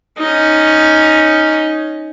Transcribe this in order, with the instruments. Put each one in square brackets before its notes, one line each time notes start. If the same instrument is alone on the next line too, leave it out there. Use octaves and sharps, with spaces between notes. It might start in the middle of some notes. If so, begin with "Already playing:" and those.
[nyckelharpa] C#4 D#4